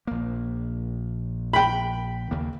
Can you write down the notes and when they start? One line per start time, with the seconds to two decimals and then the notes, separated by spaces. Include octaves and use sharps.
0.07 A#1 A#3
1.53 G5 B5
2.31 D#2 C#3 A#3